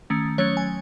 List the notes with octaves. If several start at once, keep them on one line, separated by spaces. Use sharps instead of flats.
D#3 A3 C#4
F#3 A3 C#4 C#5
G#5